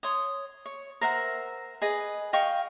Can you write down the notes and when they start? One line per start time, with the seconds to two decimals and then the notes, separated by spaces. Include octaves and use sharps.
0.03 C#5 C6 D#6
0.66 C#5
1.01 A#4 C5 E5 F#5
1.82 G#4 B4 D#5
2.33 D#5 F5 G5 C#6